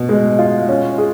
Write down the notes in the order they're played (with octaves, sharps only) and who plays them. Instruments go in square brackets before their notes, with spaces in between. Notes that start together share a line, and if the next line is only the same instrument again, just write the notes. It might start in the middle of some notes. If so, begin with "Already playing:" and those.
Already playing: [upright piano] B2
G#3
F4
C#4
G#4